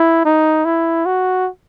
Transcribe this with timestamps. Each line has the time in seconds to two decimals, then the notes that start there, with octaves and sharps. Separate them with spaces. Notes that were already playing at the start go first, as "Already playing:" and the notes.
Already playing: E4
0.25 D#4
0.65 E4
1.06 F#4